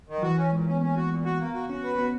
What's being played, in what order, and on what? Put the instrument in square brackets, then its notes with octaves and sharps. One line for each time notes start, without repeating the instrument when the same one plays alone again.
[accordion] D#3
[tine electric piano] F#3
[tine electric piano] E3 [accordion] F#4
[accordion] C#4
[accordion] A#2 [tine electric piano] G#3
[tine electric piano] B3 [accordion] C#4
[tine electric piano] A#3 [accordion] C#4
[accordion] F#4
A#2
F#4
[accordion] A#3 [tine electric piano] B3
[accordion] F#4
[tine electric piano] C#4 [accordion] F#4
[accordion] B4
[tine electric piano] B3 [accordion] F#4